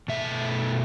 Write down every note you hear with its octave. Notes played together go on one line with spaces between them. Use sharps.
B2 A3 E5